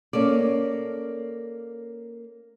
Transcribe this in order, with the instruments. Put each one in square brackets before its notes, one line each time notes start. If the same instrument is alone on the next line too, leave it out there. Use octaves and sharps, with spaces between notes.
[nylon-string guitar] A#3 C#4 A4 D5